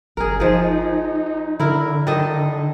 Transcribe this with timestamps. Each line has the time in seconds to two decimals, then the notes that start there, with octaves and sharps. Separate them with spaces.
0.17 G1 G#4 A#4
0.40 F3 D#4 G#4
1.60 D3 E4 A#4
2.07 D#3 A4 D#5